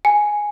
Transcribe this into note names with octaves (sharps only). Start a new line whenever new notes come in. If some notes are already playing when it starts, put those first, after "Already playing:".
G#5